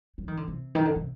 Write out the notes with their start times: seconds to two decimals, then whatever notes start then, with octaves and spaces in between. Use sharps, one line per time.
0.18 F#3
0.28 D#3
0.37 D3
0.48 C3
0.75 D#3
0.85 D3
0.96 C3